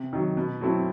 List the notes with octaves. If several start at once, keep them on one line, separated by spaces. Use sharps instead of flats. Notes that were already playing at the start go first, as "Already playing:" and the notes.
Already playing: C3
D#3 F#3
B2
F#3 A3 C4 E4